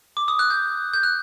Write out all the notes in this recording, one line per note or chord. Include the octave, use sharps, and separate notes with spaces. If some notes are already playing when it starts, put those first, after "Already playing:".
D6
D#6
F#6
G6
G6
F#6